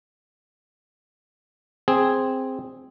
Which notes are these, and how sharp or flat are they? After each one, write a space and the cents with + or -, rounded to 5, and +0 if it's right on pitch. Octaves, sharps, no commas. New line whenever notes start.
C4 +0 G#4 -5